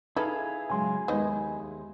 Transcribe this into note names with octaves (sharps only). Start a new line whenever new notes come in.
D#4 E4 G#4 A4 B4 F5
C#3 F#3 G#3 G#5 C6
D#2 G#3 B3 D#4 D#5